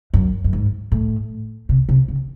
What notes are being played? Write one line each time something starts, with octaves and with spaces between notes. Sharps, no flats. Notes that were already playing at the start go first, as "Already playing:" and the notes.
F#2
F#2
G#2
A2
C3
C3
C#3